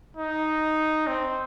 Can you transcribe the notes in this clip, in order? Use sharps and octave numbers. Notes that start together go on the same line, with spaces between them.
D#4
C4